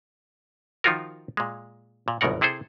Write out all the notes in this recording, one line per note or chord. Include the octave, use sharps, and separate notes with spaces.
D#3 F3 D#4 F4 F#4 A#4
A#2 G#3
A#2
G1 C2 F#2 B2 A#4 F#5
C3 E4 G#4 A4 C5